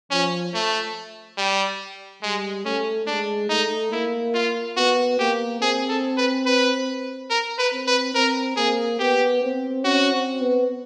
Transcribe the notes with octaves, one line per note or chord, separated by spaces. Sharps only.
F3 C#4
A3
G3
G3 G#3
A3 C#4
G#3 D4
A3 D#4
A#3 E4
F4
B3 F#4
A#3 G4
C4 G#4
A4
B4
B4
A#4
B4
C4
B4
C4 A#4
A#3 G#4
B3 G4
C4
C#4 F#4
C4
B3